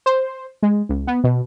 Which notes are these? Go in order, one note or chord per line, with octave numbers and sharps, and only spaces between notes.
C5
G#3
C#2
B3
B2